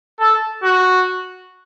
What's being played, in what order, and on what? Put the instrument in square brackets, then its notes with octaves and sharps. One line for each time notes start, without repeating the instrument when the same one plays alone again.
[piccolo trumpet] A4
F#4